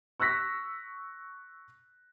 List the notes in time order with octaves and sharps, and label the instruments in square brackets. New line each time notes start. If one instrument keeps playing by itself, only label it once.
[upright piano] C#6 E6 F#6 A#6 B6